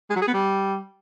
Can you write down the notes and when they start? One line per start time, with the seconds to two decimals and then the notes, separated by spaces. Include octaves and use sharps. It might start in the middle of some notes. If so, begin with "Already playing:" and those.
0.10 G#3
0.16 F#3
0.22 G#4
0.27 B3
0.33 G3